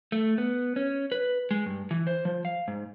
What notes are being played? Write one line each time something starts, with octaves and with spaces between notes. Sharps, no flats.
A3
B3
C#4
B4
G#3
G2
E3
C5
F3
F5
G#2